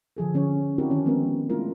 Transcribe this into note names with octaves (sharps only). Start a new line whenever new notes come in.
D3 F3 G#4 A4
D3 C#4 G#4 C#5
C4 D4 E4 F#4 G4 A#4
D#3 C#4 D#4 C#5
F3 G#3 B3 C4 D#4 A#4
G#3 A3 D4 E4 F4 A#4